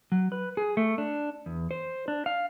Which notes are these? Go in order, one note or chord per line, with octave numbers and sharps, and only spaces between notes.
F#3
B4
G#4
A3
D4
E2
C5
D4
F5